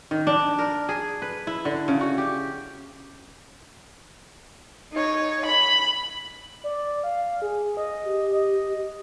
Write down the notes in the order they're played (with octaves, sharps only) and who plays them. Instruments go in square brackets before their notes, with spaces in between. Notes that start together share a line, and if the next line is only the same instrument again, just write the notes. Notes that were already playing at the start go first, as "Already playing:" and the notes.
[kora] D#3
D4
A#4
G#4
B4
E4
D3
C#3
F#4
G4
[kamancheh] D#4 C#5
B5
[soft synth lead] D5
F5
G#4
D#5
[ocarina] G4
[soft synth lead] D#5